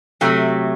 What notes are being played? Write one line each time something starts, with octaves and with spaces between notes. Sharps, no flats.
C3 F#3 A3